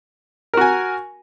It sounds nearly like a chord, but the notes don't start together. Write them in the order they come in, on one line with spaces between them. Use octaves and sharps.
A#4 F#4 G#5